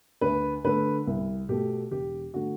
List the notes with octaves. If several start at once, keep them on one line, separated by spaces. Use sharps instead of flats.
D2 B4
D3 A3 B4
C2
B2 A3 G4
E1 G4
D3 A3 F#4